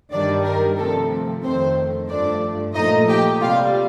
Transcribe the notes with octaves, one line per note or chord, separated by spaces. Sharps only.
G2 D#3 G3 D4 D5
A#4
C3 F3 A3 A4
F2 D#3 A3 C4 C5
G2 F3 A3 D4 D5
A#2 F3 A3 D#4 D#5
G4 G5
C3 G3 F4 F5